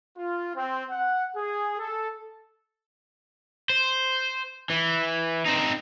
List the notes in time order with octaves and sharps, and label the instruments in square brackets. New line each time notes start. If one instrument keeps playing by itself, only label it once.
[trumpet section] F4
C4
F#5
G#4
A4
[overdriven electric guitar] C5
E3
C4 D#4